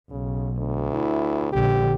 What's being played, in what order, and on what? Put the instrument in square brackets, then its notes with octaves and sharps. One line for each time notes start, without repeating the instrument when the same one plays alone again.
[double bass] B1 [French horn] C#3
[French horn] D2
[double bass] E4
[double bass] A#1 D3 [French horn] G4